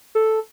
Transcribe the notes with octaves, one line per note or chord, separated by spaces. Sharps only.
A4